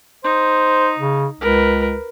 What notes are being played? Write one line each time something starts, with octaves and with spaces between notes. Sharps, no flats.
D#4 C5
C#3
C#2 A#4 B4